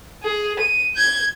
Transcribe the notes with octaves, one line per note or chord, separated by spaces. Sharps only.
G#4
D#7
G6 G#6